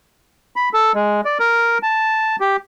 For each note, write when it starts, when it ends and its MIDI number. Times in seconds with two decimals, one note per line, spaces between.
0.56 0.69 83
0.74 0.92 69
0.95 1.21 56
1.25 1.38 74
1.39 1.78 70
1.83 2.36 81
2.40 2.57 67